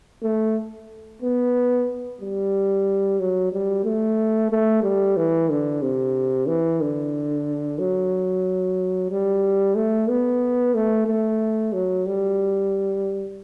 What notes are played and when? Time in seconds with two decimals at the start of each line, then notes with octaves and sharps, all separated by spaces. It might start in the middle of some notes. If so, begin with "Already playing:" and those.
0.23 A3
1.22 B3
2.21 G3
3.20 F#3
3.53 G3
3.85 A3
4.51 A3
4.83 G3
5.17 E3
5.50 D3
5.82 C3
6.47 E3
6.81 D3
7.79 F#3
9.10 G3
9.75 A3
10.08 B3
10.75 A3
11.07 A3
11.73 F#3
12.06 G3